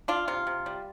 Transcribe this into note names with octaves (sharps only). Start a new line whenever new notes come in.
D4 F4
C3 F4
C3
G3